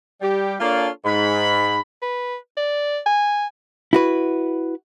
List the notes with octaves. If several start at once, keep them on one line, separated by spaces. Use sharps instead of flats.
G3 G4
A#3 D4 F4 A4 C#5 D5
G#2 B5
B4
D5
G#5
E4 F#4 B4